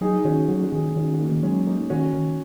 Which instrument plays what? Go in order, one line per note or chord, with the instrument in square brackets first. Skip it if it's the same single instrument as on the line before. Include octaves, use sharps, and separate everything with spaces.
[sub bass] F#3 [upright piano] D#4 G#4
[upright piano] D#4
[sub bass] D#3 [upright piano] C#4 F#4
[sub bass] F#3 [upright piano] C#4 F#4
[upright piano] F#4
[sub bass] D#3 [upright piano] D#4 G#4
[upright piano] D#4
[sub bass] D#3 [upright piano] C#4 F#4
[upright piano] F#4
A#3 D#4
[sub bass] D#3
[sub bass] F#3 [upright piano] G#3 C#4
[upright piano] A#3 D#4
[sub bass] D#3 [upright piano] C#4 F#4
[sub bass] D#3